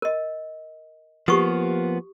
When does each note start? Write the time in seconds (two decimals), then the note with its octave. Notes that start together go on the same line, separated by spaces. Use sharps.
0.02 A#4 D#5
1.28 F3 A#3 B3 G4 C#6 D#6